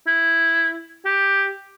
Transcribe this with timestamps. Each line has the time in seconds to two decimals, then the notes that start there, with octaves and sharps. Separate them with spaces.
0.07 E4
1.05 G4